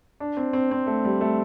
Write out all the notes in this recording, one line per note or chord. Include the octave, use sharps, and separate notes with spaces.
D4
C4
C4
C4
A3
G3
A3